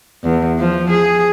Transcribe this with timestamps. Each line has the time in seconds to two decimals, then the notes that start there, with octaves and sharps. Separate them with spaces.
0.23 E2
0.59 F3
0.90 G#4